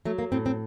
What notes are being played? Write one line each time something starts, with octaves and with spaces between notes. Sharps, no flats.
F#3 A3
A#3
A2 C4
C4